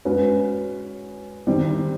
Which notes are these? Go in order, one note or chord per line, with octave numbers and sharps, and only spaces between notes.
G#3 C#4 F#4 B4
D#3 G3 C4 E4